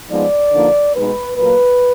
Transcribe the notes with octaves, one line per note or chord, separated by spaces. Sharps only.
F3 G#3 B3 D#4 D5
D3 F3 A#3 D#4
B2 G#3 D#4 B4
A#2 F#3 A#3 B4